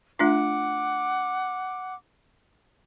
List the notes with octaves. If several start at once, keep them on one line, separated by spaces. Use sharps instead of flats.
A3 D4 F4 F#5 D6